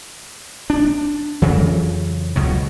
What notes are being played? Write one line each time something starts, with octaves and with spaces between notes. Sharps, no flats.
D4
F2 C#3 E3 F#3
C#2 B2 F#3